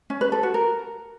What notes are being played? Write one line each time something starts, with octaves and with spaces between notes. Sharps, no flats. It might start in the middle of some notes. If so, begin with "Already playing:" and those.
C#4
B4
A4
F#4
A#4